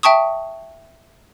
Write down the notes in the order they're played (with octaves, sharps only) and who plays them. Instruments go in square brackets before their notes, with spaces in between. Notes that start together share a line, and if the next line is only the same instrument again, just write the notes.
[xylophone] E5 G5 A5 C#6 D#6